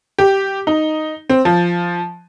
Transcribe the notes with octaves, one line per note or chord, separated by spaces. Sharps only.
G4
D#4
C4
F3